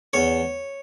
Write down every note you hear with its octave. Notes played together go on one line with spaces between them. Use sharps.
E2 C#5